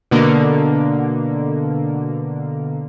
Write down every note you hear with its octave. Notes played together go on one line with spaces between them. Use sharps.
B2 D3 A#3